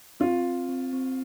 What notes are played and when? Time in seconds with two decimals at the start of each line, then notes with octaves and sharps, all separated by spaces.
0.20 C4 F4
0.45 C4
0.69 C4
0.93 C4